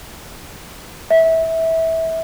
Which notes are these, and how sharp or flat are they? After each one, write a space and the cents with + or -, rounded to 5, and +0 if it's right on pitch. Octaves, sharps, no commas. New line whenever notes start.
E5 -20